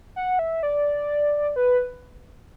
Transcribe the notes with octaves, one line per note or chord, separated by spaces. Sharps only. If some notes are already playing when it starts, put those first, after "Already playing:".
F#5
E5
D5
B4